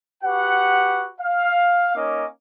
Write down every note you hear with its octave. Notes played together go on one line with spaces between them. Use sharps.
F#4 G4 B4 F#5
F5
A#3 C#4 D#4 C#5 D#5 D6